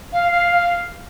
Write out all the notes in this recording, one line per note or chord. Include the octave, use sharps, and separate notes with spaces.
F5
F5
F5